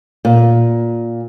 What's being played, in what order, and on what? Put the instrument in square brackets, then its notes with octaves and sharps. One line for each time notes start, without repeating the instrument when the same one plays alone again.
[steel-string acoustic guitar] A#2